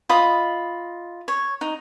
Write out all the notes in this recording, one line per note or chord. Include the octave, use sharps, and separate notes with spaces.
F4 D#5 B5 D#6
C#5
D#4